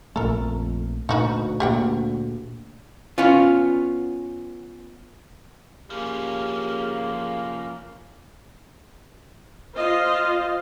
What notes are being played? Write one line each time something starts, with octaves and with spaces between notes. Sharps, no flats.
A#1 F2 A#2 A3 A4 A#4
D2 A#2 D#4 F#4 B4
A#2 A#3 G4 F#5 G5
B3 C#4 F4
F3 A#3 C#4 G4 G#4
F4 C5 D#5 F5